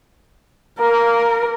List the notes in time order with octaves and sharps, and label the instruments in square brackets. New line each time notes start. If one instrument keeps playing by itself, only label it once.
[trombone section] A#3 [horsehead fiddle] A#4